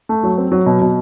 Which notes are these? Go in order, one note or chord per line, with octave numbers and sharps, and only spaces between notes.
A3
F#3
C4
F#3
B2
B2